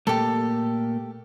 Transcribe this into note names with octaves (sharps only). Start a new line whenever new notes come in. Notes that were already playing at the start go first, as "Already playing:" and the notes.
A#2 A3 A#3 G4 A4